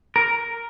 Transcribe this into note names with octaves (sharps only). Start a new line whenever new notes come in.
A#4